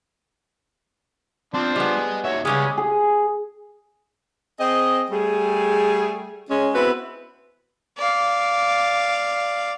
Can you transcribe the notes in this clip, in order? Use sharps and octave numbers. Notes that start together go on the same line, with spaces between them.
F3 C4 D4 C5
G3 B3 G#4 D#5
D#2 F#4 C#5 E5
C#3 G3 G#3 B3 C#4 G#4 D#6
G#4
C4 G#4 D#5
G3 A3 G#4
G#3 C#4
B3 C4 E4 F#4 B4
D5 F5